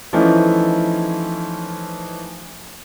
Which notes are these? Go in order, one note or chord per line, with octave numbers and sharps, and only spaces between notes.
E3 F3 A3 C#4 D#4 E4